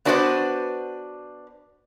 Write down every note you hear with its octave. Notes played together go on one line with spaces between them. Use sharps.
B3 D4 F#4 B4 C5 D5